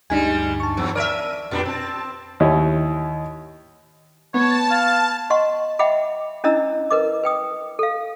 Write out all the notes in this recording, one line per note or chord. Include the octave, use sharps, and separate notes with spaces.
D2 G2 G3 G#3 D4 D#4 G#5
A5 C#6
E2 F#3
A#4 C#5 D5 E5 D#7
F2 A#2 D4 G4 B4
C4 A5 A6
D#2 E4 C#5 D#5
B3 C#5 A5
F5
D#5 F#5 C6 C#6
D#5 E5 F#5 G5 B5 D6
C#4 D4 E4 D#5 A#5 E6
A#4 B4 D#5 D6
B4 G5 D#6
A4 F5